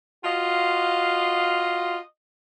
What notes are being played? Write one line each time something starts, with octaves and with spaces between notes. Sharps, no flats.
F4 F#4 D#5 F5 C6